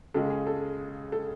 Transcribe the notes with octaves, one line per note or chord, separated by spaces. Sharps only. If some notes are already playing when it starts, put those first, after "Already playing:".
C#2 C#3 G#3 A4
G#4
A4
A4